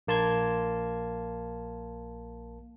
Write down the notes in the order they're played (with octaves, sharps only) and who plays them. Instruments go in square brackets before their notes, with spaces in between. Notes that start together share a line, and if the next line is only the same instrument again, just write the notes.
[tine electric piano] A#1 A#3 A5 C6 G#6